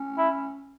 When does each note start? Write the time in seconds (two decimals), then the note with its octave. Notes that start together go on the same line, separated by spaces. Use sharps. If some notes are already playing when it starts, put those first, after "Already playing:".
Already playing: C#4
0.18 E4